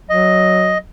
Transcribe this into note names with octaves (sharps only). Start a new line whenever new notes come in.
F#3 D#5